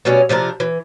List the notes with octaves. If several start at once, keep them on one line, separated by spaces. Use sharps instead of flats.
B2 F#3 G3 C#4
C3 F3 D4 A#4
E3